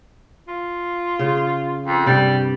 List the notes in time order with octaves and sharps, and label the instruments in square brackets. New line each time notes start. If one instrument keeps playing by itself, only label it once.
[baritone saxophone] F4
[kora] C#3
[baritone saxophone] F2
[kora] G2 C3 [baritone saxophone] G3